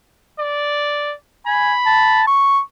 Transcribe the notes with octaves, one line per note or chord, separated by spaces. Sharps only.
D5
G#5 B5
A5
C#6